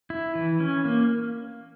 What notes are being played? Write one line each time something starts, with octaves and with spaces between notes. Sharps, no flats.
E4
E3
C#4
A#3